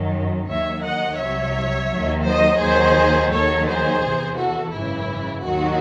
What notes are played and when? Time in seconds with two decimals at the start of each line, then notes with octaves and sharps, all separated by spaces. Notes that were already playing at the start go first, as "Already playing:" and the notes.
Already playing: F#2 D#3 F#3
0.48 D#2 D#3 F#3 C#5 E5
0.83 D#5 F#5
1.19 C2 C3 F#3 C#5 E5
1.90 D#2 D#3 F#3
2.25 C5 D#5
2.61 D#2 D#3 F#3 G#4 C5
3.32 D#2 D#3 F#3 A4 C#5
3.67 G#4 C5
4.03 E2 C3 E3
4.38 F#4 A4
4.74 G#1 F#2 C#3 E3 E4
5.45 D#2 D#3 F#3 F#4